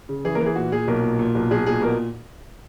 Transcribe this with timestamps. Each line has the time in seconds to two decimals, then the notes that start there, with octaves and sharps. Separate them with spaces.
0.09 C#3
0.25 E3 G#4
0.35 A#3 A#4
0.41 E3
0.46 G#4
0.56 A#2 F#4
0.72 A#2 G#4
0.88 B1 A#3 A#4
1.03 A#2
1.19 A#2
1.35 B1
1.51 B1 G#4
1.66 A#2 G#4
1.82 B2 A#3 A#4